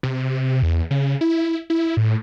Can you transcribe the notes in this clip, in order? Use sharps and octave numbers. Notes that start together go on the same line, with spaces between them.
C3
E2
C#3
E4
E4
A2